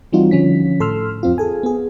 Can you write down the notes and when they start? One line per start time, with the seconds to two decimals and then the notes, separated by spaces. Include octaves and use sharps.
0.13 E3 G3 C4 D#4 F4 F#4
0.31 D3 F3 C#4 B6
0.80 A2 A4 C6 E6 F6
1.23 F2 C4 F4
1.38 G#4 A4 G#5
1.63 B3 G#4